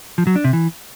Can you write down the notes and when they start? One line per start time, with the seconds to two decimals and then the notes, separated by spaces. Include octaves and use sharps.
0.18 F3
0.27 F#3
0.36 D4
0.44 C3
0.53 E3